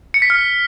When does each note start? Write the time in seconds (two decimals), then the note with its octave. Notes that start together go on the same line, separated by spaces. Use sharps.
0.14 C#7
0.22 B6
0.30 F6